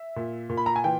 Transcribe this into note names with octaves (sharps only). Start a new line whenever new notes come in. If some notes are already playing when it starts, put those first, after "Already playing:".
Already playing: E5
A#2
A#2
B5
A#5
G#5
E3 G5